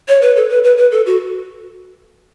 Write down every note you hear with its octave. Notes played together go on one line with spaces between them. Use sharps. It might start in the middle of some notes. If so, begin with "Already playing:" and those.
C#5
B4
A4
B4
B4
B4
A4
F#4